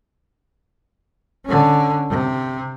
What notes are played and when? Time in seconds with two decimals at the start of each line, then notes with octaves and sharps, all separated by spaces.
1.46 D3 C#4
2.09 C3